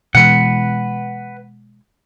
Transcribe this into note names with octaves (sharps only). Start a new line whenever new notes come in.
B2 E3 G#3 B4 F#5